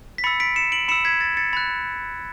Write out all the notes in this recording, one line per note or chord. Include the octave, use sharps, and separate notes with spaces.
B6
B5 E6 A6 C#7
B6 D7
C#7 E7
D7 F#7
B5 E6 C#7 E7
G#6 B6
A6
A6 C#7
B5 F#6 A6